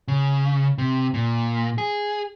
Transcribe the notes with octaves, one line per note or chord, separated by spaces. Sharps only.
C#3
C3
A#2
G#4